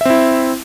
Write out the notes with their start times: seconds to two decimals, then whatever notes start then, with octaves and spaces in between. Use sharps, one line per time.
0.01 E5
0.05 C4
0.10 E4